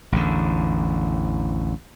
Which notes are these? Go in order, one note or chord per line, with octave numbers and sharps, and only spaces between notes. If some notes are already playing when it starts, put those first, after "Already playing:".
A1 E2 D3